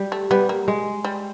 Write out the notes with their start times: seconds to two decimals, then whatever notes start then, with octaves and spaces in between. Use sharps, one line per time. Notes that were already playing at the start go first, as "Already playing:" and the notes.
Already playing: G3
0.12 A3
0.31 G3 B3
0.49 A#3
0.68 G#3
1.04 G3